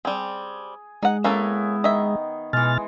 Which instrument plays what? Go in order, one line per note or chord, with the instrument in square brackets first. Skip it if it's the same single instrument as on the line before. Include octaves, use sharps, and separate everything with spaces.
[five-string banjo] G3 C4 [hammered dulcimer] G#4
[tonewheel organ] G#3 [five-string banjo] D#4 F#5
[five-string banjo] A#3 C#4 A4 [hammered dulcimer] B3 E4
[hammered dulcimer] D#3 [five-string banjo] D#5 E5
[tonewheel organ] B2 F6 A6 [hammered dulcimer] E3 G#3